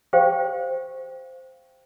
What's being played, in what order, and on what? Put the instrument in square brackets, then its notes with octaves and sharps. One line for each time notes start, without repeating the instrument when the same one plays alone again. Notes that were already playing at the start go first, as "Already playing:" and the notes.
[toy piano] G4 C5 F5 G5